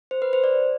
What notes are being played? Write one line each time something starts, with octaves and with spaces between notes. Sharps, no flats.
C5
B4
C5
D5